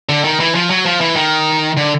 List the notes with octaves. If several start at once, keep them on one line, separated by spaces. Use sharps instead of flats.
D3
D#3
E3
F3
F#3
F3
E3
D#3
D3